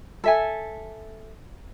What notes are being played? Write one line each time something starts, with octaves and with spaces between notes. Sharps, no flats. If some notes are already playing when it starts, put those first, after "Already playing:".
A4 E5 G#5